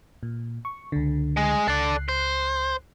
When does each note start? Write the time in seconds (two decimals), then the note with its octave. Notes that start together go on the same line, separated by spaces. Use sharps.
0.23 A#2
0.65 C#6
0.92 C#2 D3
1.37 G#3
1.68 C#2 A4 D5 F#6 C7
2.09 C5